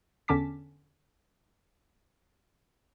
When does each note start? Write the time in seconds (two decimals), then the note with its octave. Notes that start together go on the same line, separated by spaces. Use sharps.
0.28 E2 D3 C#4 A5 D6 B6